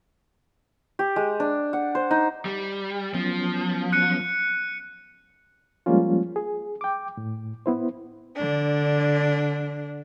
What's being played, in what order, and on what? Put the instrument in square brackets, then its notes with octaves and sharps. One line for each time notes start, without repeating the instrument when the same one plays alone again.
[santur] G4
G#3
D4
F#5
C5
D#4
[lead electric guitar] G3
[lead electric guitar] F3 [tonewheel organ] F#3 B3 C#4
[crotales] F#6 C#7 D#7
[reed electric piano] F3 G3 G#3 A#3 C#4 F4
G#4
G5 D6
A2
B3 E4 C5
[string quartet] D3 D4